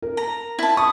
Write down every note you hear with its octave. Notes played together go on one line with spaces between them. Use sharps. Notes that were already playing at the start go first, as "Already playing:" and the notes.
A#4
A#5
E4 A5
C#6 D#6